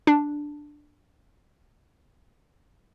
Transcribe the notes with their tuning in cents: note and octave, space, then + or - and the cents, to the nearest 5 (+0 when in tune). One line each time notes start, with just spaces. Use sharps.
D4 +5